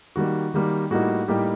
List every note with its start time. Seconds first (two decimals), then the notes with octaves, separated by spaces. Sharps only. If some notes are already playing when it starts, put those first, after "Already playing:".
0.16 D#3 G3 A#3 F#4
0.54 D#3 G3 A#3
0.90 A2 G3 A#3 D#4 F#4
1.28 A2 G3 A#3 D#4 G4